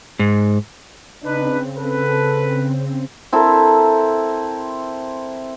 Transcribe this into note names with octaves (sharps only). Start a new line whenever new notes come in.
G#2
C#3 C4 D4 D#4 B4
A4 B4
C4 E4 A4 A#4